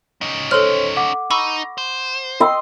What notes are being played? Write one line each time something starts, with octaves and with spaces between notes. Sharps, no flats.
C#4 D#4
A4 C5 C#5 C6 F6
F#5 D6
D#4 B5 C#6 E6
C5
D#5 G5 C6 E6